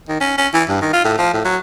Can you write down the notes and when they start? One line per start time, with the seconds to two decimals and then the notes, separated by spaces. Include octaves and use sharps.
0.09 D#3
0.20 C#4
0.38 C#4
0.54 E3
0.69 G2
0.81 D#3
0.93 F4
1.05 A2
1.18 F3
1.34 A2
1.45 F#3